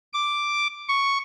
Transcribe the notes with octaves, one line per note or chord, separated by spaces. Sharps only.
D6
C#6